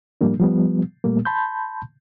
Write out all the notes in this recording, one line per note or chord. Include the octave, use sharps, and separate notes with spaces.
A2 F3 G3 A#3 D4
F3 G3 B3
A#2 G3 A3 A#3
A5 B5 C6 G6